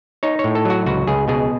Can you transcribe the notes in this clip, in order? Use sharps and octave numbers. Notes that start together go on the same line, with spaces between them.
D#4 C#5
C#5
A2
A4
F#3 F#4
C#2 F#4
C#2 G#4
B2 G#4